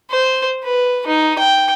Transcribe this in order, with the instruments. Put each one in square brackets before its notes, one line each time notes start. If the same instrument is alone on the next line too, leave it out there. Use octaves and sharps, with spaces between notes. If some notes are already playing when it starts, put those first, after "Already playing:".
[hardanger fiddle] C5
B4
D#4
G5